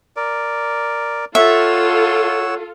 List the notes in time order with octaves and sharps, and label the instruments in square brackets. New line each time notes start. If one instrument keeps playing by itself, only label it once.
[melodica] A#4 D5
[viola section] F4 A4 [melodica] C#5 F#5 E6 [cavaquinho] E5